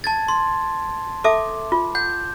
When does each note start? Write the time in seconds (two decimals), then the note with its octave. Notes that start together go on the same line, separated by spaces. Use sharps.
0.04 A5 G#6 A6
0.28 C6
1.24 A4 E5 A5 D6
1.72 F4
1.95 F#5 G6